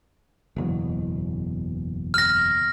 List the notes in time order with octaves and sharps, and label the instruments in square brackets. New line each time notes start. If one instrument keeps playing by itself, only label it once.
[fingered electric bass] F#1 E2 B2
[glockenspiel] F6 A#6